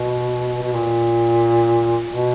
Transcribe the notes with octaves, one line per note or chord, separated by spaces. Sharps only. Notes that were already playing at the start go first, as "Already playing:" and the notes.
Already playing: B2
B2
A#2
B2